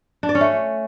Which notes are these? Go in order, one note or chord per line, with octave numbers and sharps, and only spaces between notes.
D4
D5
C#4
A3